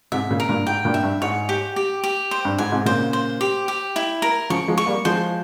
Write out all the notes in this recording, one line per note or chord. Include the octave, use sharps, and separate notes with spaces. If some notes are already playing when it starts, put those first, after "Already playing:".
G#2 C3 E5
A#2 C#3
A#4
G2 A#2
G#2 G5
G2 A#2
E5
G2
G#2 C#5
G4
G4
G4
C5
G2
G#2 G#5
G#2 C3
A#2 C#3 C5
C5
G4
G4
E4
A#4
C#3 F3 C#6
F3 G#3
C#6
G3 A#3
F3 G#3 C5